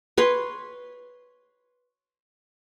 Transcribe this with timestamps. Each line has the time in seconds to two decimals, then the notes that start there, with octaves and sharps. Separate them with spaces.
0.17 B4 C#5 C6